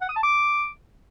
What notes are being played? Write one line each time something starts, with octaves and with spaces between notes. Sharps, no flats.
F#5
D#6
A5
D6